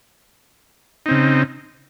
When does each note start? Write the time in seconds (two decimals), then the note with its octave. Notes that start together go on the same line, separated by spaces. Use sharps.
1.06 D#4
1.08 C4
1.11 C#3